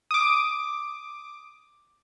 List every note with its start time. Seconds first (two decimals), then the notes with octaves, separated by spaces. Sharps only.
0.11 D6 D#6